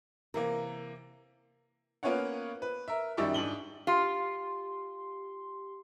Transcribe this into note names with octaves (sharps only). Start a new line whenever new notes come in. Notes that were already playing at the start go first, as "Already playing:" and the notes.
C3 E3 A#3 A#4
A#3 B3 C#4 F4 C#5 F#5
B4
A#4 E5
F#2 D#3 G3 D5 E5 C#6
G#2 D4 F#7 G7
F4 G4 C6